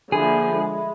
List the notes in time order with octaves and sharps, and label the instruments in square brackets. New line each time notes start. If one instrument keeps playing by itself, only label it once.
[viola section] D3 F3 A#3 [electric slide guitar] G#4 [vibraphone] E5 B5
[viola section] G#3